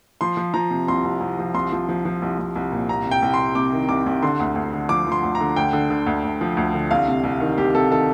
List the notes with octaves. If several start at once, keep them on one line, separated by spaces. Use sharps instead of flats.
F3 C6
F3
F3 A#5
C3
C2 C6
C2
C2
F3
C2 C6
F3
F3
F3
C2
C2
C2
A#2
C2 A#5
C3
G5
C2
C6
C2
C3 D6
D#3
C2 D6
C2
D3 C6
D2
D2
D3
F3 D6
F3
C6
D2
A#5
D3
D2 G5
D3
D3
D2
D2
F3
D2
D3
C2 F5
C3
C2
D#3
C2 G4
C3 A4
D#3 A4